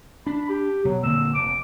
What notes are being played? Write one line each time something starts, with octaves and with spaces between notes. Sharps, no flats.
D4 B5
G4
B2 F#3
A#2 D3 A#3 E6
F1 D6